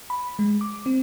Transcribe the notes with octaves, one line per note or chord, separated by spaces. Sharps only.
B5
G#3
D6
C4